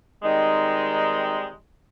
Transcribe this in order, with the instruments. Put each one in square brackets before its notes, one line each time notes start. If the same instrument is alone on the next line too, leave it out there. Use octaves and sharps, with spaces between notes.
[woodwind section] D#3 G3 G#3 C4 D#4